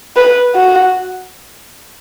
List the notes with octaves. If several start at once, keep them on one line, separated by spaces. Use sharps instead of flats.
B4
F#4